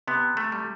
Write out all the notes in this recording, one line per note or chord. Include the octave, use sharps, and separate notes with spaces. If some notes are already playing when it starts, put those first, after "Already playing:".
C3 B3
A3
G3